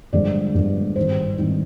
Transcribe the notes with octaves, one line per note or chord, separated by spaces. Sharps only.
G1 G2 D3 F3 G#3 D5
G1 G2 D3 F3 G#3
G#1 G2 D#3 C5
G#1 G2 D#3